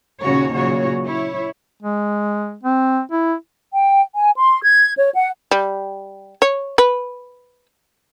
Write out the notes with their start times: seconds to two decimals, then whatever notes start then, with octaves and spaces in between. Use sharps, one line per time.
0.23 D#2 A#2 C#3 C#4 F#4 C#5
0.55 A#2 C#3 F#3 F#4 C#5
1.07 E4 C#5
1.82 G#3
2.63 C4
3.11 E4
3.73 G5
4.15 G#5
4.36 C6
4.62 G#6
4.96 C#5
5.15 F#5
5.51 G3
6.42 C#5
6.78 B4